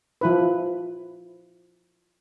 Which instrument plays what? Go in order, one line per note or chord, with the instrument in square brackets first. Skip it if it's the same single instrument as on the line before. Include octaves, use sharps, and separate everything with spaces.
[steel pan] F3 E4 B4